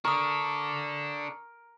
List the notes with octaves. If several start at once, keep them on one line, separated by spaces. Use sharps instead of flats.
D4 A4 A#4 C#6 D#6